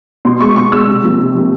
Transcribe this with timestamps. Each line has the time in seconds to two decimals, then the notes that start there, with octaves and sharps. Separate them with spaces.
0.25 B2 C6
0.40 G#3 C#6
0.56 B2 C#6
0.72 G#3 E6
0.88 C3
1.03 F3 A#3
1.19 C3
1.35 F3 A#3